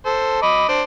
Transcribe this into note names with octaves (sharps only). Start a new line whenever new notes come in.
A4 C5
D#5 B5 D6
D4 C5